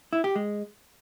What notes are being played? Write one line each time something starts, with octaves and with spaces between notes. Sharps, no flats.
E4
G4
G#3